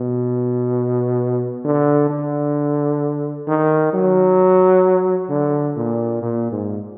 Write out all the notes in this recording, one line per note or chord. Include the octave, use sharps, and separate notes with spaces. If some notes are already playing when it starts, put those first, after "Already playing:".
Already playing: B2
D3
D3
D#3
F#3
D3
A#2
A#2
G#2